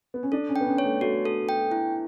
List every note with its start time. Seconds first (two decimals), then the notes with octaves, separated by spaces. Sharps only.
0.14 B3
0.23 C#4
0.32 D4 A4
0.49 C#4
0.56 G5
0.61 B3
0.67 C#4
0.78 C#5
0.84 A3
1.01 A3 F#4
1.25 A4
1.49 G5
1.72 E4